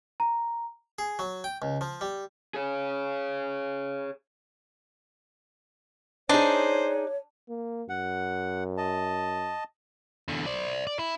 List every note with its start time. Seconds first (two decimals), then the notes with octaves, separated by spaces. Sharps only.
0.20 A#5
0.99 G#4
1.19 F#3
1.44 G5
1.62 C#2
1.81 F3
2.01 G3
2.54 G#4 C#5
6.29 D4 D#4 G#4 C5 C#5
7.49 A#3
7.89 F#2 F#5
8.78 D#5 A5
10.28 E2 D3
10.46 C5 D5
10.87 D5
10.99 E4